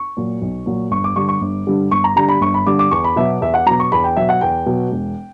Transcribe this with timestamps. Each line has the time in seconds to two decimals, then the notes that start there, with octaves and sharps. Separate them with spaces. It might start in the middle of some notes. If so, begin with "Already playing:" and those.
Already playing: C#6
0.17 A#2 F#3
0.42 B1
0.66 A#2 F#3
0.91 G1 C#6
1.04 D6
1.16 G2 D3 G3 C#6
1.28 C#6
1.42 G1
1.67 G2 D3 G3
1.91 G1 C#6
2.04 A#5
2.16 G2 D3 G3 A#5
2.29 B5
2.41 G1 C#6
2.54 B5
2.67 G2 D3 G3 D6
2.79 D6
2.91 E2 C#6
3.04 B5
3.16 B2 F#3 E5
3.41 E2 E5
3.54 F#5
3.66 B2 F#3 A#5
3.80 C#6
3.92 E2 B5
4.04 G5
4.17 B2 F#3 E5
4.29 F#5
4.41 E2 G5
4.66 B2 F#3
4.92 E1